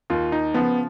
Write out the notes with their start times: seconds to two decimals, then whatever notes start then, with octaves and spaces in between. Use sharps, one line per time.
0.10 D#2 F4
0.32 D#4
0.54 C#3 F3 B3